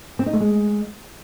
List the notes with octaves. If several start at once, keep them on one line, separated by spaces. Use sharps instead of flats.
C4
D#4
A3
G#3